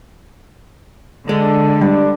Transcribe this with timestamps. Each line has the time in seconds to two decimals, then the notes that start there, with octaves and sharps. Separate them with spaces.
1.29 D3 G#3 A4
1.81 G3 D4